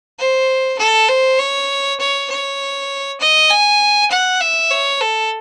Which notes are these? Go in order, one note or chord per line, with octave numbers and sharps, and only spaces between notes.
C5
A4
C5
C#5
C#5
C#5
D#5
G#5
F#5
E5
C#5
A4